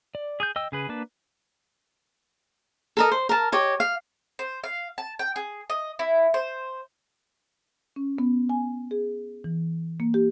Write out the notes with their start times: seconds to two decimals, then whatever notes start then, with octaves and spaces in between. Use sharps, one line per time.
0.15 D5
0.40 G#4 D#6 G6
0.56 D#5 G5 E6
0.72 C#3 G#4 B4
0.89 A#3 D4 B4 A5
2.97 A4 A#4 D#5
3.11 C5
3.29 A#4 A5
3.52 G4 C#5 D#5
3.80 F5
4.39 C5
4.64 F5
4.98 A5
5.19 G5
5.36 G#4
5.70 D#5
5.99 E4
6.34 C5
7.96 C#4
8.18 B3
8.49 G#5
8.91 G#4
9.44 E3
10.00 A#3
10.14 G4